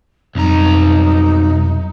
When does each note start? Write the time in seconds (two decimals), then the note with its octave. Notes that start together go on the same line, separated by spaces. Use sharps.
0.35 B1 F2 G3 D#4 A#5